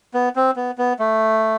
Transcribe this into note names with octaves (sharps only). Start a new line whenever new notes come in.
B3
C4
B3
B3
A3